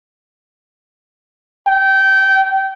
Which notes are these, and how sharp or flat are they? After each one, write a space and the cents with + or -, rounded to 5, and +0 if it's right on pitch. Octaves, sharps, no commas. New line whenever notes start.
G5 -20